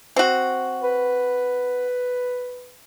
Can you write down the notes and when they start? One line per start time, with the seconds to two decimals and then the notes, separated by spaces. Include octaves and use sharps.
0.16 C4 F#4
0.83 B4